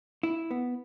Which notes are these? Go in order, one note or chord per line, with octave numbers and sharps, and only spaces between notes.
E4
B3